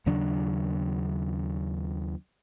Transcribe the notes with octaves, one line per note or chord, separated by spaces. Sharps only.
D#2 C#3 F#3 D4